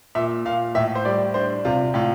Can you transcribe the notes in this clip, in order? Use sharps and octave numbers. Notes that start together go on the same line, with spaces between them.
A#2 E5
A#2 F5
A2 E5
C5
G3 D5
D4 C5
C3 F4
A2 F4